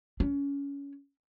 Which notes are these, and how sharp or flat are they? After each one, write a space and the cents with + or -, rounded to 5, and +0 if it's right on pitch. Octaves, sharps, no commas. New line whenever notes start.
C#4 +20